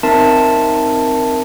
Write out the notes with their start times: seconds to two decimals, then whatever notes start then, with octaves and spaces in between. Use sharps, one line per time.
0.03 C4 D#4 A#4 E5 A5 C6